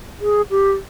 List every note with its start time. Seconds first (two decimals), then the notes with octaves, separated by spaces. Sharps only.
0.21 G#4
0.51 G4